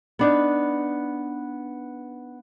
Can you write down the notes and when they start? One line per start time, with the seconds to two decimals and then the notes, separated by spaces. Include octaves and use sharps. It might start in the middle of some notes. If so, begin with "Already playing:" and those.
0.19 B3 D4 D#4